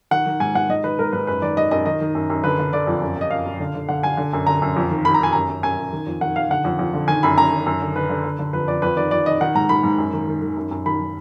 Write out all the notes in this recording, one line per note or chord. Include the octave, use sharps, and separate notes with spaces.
D#3 F#5
D#3
G#2 G#5
G#2 F#5
G#2 D#5
D#3 B4
G#2 A#4
G#2 B4
F#2 B4
D#3 D5
D#3 D#5
F#2 D#5
D#3 D#5
D#3
F#2
F#2
D3 B4
D3
D3 D5
F2
F#2
F#2 D#5
F#2 F5
F#2
D3
D3
D3 F#5
D3 G#5
D3
F#2
D3 A#5
F#2
F2
D#3
D#3 B5
A#5
D#3 G#5
F#2 A#5
F#2
F#2 G#5
F#2
D#3
F2
D#3 F#5
D#3 F5
D3 F#5
F2
F2
D3
D#3 G#5
F#2 B5
F#2 A#5
D#3
F#2
D3
D3 B4
D3
D3
D3
F2 B4
F2 D5
F2 B4
D#3 D5
F2 D5
D#3 D#5
D#3 F#5
G#2 A#5
D#3 B5
G#2
F#2
D#3
D#3
D#3
F#2
F#2
D#3 B5
D#3